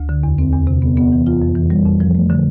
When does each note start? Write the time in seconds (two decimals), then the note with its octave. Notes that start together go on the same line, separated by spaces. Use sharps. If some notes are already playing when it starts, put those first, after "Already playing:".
Already playing: D2
0.09 D3
0.23 E2
0.38 C4
0.53 E2
0.67 C3
0.82 B3
0.97 B3
1.12 E3
1.27 F4
1.42 F2
1.55 E3
1.70 G3
1.85 F2
2.00 F3
2.15 A3
2.30 D3